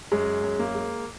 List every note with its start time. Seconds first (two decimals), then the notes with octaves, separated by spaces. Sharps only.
0.12 F#2 G#3
0.44 F#2
0.59 A#3
0.75 G#3